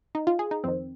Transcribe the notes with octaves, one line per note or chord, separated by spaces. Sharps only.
D#4
F4
G#4
D#4
F2 D#3 C4